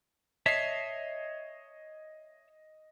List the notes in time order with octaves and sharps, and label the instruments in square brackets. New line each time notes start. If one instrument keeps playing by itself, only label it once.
[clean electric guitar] C#5 E5 A5 [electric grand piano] D#5 C7